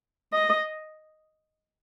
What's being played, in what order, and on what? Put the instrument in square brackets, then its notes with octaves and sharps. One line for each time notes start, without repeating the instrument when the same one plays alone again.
[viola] D#5